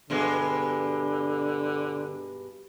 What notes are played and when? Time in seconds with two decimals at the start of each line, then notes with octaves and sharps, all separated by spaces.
0.10 G2 B2 D3 G#3